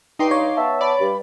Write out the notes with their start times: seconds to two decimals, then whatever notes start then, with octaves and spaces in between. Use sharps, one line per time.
0.19 G2 D#4 G5 C6 D6
0.31 C#5 F5
0.57 B3 E5 A5
0.81 D5 B5
1.00 G2